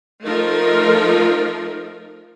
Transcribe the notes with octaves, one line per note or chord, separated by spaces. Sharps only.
F3 A3 D#4 F4 A#4